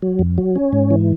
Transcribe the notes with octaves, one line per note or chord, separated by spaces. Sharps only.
F#3
F2
F#3
C#4
G#2
E3